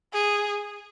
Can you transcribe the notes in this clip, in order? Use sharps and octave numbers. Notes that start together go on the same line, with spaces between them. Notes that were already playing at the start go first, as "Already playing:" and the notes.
G#4